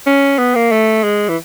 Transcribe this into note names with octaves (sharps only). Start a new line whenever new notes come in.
C#4
B3
A#3
A3
G#3
E3